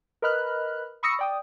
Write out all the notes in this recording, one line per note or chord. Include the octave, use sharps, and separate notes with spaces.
A#4 B4 D#5 B5 F6 F#6
B5 C#6 D#6 E6 A#6 C#7
D5 G5 D#6